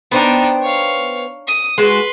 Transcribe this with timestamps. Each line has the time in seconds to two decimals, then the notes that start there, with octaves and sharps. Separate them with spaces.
0.11 B3 D4 D#4 C5 G5
0.62 C#5 F5
1.47 D#6
1.78 G#3 F#4 B4 C6